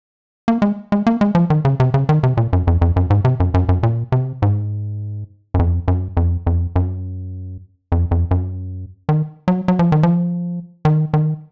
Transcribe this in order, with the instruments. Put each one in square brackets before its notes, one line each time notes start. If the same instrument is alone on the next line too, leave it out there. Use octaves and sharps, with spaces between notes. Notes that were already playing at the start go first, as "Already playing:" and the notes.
[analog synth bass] A#3
G#3
G#3
A#3
G#3
F3
D#3
C#3
C3
C#3
D#3
C3
A#2
F#2
F2
F2
F#2
G#2
C3
F#2
F#2
F#2
A#2
C3
G#2
F#2
F2
F#2
F2
F2
F#2
F2
F2
F#2
D#3
F#3
F#3
F3
D#3
F3
D#3
D#3